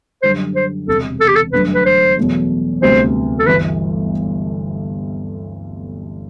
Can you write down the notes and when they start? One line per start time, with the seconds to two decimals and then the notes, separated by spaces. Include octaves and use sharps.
0.22 F#2 D3 G3 C5
0.56 C5
0.88 E1 E2 C3 A4
1.20 A4
1.28 G4
1.36 A4
1.53 G1 F#2 D3 A3 D4 B4
1.74 B4
1.85 C5
2.18 E2 B2 F#3 A3
2.82 D2 C3 G3 B3 C5
3.39 A4
3.47 G1 G2 E3 B4